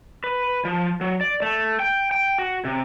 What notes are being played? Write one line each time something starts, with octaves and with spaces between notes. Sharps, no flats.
B4
F3
F#3
D5
A3
G5
G5
F#4
C3